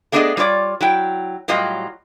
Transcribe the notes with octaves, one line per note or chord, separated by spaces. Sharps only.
A3 B3 D4 G#4 C5 D#5
G3 F4 C#5 D5
F#3 E4 G5
A2 F#3 G3 F4 D#5